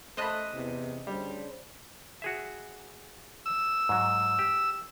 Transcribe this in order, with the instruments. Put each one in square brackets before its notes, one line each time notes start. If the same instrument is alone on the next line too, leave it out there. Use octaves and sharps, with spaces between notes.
[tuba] A3 [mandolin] C#4 D#5 F#6 [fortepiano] C5 A5 B5
[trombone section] E2 [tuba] C3
[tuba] D2 [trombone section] C#3 D4 C5 [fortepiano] G3
[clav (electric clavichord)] F#4 G#4 E5
[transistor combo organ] E6
[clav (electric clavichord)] G#2 F#3
G4